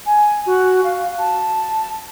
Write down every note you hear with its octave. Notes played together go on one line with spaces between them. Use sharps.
G#5
F#4
F5
A5